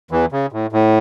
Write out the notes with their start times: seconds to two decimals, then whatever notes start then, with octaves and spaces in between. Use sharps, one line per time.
0.11 E2 E3
0.32 C#3
0.52 A2
0.72 A2